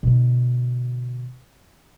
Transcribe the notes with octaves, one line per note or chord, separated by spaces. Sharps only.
B2 D3